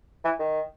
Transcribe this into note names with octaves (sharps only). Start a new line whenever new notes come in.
E3
D#3